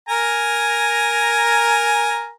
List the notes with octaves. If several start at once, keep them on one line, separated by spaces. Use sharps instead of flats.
A#4 G#5 A#5